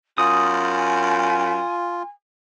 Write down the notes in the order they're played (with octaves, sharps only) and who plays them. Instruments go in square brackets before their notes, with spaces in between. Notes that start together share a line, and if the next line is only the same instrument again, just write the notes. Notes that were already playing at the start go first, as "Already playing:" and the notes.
[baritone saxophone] F#2 [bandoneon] F4 [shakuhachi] G#5 [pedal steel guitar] D#6